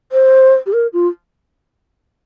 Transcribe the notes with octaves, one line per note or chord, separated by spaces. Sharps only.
C5
G4
A#4
F4